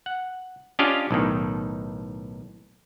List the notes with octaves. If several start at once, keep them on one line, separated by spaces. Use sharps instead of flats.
F#5
C#4 D4 F4 G4 D#5 F5
B1 A2 D#3